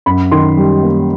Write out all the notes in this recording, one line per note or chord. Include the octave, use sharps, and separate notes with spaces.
F#2 B5
D#3 C6
G3
A#3